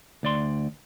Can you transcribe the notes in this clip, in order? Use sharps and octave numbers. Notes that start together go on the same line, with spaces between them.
D2 D5 C6